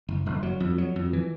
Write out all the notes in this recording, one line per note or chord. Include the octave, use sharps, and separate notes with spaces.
F#1
F#1
F#3
F2
F#3
F2
E3